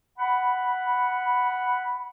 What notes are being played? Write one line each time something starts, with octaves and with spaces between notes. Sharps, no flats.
F#5 B5